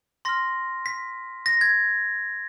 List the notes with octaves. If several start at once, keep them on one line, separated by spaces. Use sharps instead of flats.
C6 F6 A#6
B6
A#6
G#6